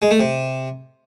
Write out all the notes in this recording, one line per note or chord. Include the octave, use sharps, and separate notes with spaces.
G#3
A3
C3